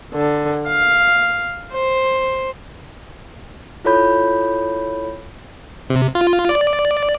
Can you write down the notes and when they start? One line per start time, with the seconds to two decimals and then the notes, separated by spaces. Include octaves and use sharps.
0.14 D3
0.67 F5
1.73 C5
3.84 E4 F4 A4 C#5 B5 G6
5.90 C3
6.15 F4
6.49 D5